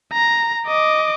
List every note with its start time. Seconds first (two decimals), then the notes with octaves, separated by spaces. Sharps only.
0.13 A#5
0.67 D#5 D6